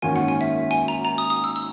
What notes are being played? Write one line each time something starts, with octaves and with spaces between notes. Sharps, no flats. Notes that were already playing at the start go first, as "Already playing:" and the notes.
G#1 F#2 D#3 A#3 C#4 G#5
F#5
G#5
E5
G#5
A#5
A#5
D#6
D#6
E6
E6